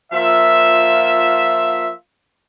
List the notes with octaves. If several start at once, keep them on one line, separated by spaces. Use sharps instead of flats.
F3 A#3 F4 E5